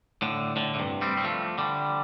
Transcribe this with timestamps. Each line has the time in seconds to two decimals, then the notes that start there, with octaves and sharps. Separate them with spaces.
0.22 A2 D3
0.56 A2 D3
0.74 A2
0.79 G2 C3
1.01 G3 C4
1.17 C4
1.24 F3 A3
1.58 D3 G3